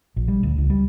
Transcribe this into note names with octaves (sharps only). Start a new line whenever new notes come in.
A#1
G3
D2
C#2
G3